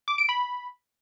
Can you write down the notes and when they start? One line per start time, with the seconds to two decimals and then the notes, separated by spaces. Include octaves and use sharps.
0.08 D6
0.18 D7
0.29 B5